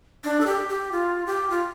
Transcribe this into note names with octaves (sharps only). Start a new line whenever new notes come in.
D4
A4
G4
G4
F4
G4
F4